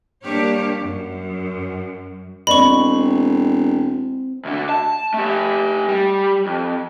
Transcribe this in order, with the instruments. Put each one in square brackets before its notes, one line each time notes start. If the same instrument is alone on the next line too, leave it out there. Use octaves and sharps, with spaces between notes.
[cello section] G3 A#3 D4 G4 A#4 C#5
F#2
[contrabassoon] E1 [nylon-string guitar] C4 D5 D#5 [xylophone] B5 C#6
[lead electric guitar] D2 D3
A5
A3 G4
G3
F2